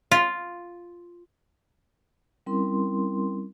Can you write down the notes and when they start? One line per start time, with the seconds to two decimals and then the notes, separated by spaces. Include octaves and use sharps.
0.11 F4
2.46 G3 C4 C#4 E4 A#4 C6